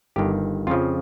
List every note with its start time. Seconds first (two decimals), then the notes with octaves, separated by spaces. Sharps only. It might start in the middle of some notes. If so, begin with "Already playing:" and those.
0.16 G1 G2 D#3 G4
0.67 F2 C#3 F3 F4